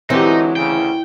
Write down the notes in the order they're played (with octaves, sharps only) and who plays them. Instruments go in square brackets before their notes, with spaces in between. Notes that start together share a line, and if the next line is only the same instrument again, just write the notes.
[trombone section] D3 F#3 G#3 [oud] E3 [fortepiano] C4 G4 [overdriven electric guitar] D#4
[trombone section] D2 C#3 [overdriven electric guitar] G5